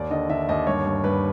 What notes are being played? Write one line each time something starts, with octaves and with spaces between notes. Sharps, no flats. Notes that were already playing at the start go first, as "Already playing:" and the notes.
Already playing: D#2 D5
D3 D#5
D3 E5
D#2 D#5
G2 C#5
G2
G2 B4